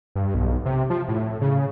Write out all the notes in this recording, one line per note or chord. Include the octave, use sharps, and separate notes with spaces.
G2
B1
C3
F3
A2
C#3